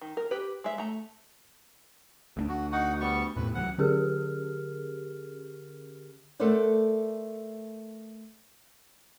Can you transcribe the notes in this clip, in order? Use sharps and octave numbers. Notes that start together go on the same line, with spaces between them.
D#3
A#4
G4 B4
G#3 E5
A3 A#5
D2 A#3 D4
F#4
D#4 F#4 F#5
G3 B3 C#6
E2 A2 C3 B4
C#2 E3 F#3 F#5
D3 C#4 G4 G#4 A#4 F6
A3 A4 A#4 C5 D5 F#5